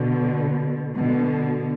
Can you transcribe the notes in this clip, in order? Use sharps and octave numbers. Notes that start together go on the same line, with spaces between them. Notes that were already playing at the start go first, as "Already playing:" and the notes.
Already playing: B2 D3
B2 D3